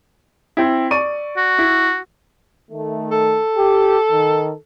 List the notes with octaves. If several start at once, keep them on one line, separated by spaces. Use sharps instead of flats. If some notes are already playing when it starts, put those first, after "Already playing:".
C4 E4
D5 C#6 D#7
F#4
E4
D#3 A3
A4
G4
D#3